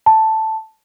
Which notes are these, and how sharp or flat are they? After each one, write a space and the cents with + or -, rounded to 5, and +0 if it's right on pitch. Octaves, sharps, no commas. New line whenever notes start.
A5 +0